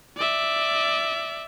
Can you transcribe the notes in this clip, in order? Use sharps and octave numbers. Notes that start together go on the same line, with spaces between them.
D5 E5